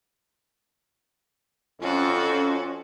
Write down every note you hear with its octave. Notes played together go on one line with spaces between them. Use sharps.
F2 C#4 F4 F#4 A4